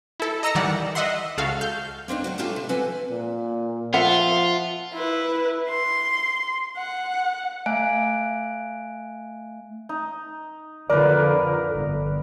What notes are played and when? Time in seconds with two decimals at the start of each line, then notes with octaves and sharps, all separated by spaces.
0.20 E4 A4
0.43 D#5 A#5 E6 A#6 C#7
0.55 D#3 E3 G3 D5 F#5
0.95 D#5 E5 F#5 C6
1.38 C#2 F#4 A4 F5
1.61 F6 G6
2.08 A#3 C4 D4 D#4
2.24 D#3 F#3 F#4
2.38 G3 C#4 F4 G4 A4 E5
2.56 C3
2.69 F3 C4 A4 B4 F#5 G#5
3.11 A#2
3.94 F3 F4 E5 F#5
4.93 E4 B4
5.69 C6
6.77 F#5
7.66 A3 E5 F5 G#5 F#6 D7
9.89 D#4
10.90 F2 D3 F3 A#4 B4 D5
11.73 G1